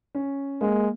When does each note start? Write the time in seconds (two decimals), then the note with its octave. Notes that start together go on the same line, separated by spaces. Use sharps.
0.15 C#4
0.61 G#3 A#3